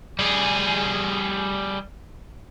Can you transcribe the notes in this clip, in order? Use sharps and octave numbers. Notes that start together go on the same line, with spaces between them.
G3 G#4